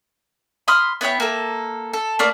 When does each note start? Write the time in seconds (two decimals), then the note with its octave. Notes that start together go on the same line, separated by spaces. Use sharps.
0.68 B5 C6 D#6 F6
1.01 B3 E4 C#5 G5
1.20 A#3 A4
1.93 A4
2.19 A3 A#3 D5